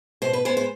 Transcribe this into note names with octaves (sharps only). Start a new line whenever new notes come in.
B2 C5
B4
G#3 B3 C5
C5